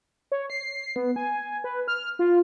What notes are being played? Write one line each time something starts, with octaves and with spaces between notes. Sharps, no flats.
C#5
C7
B3
G#5
B4
F6
F4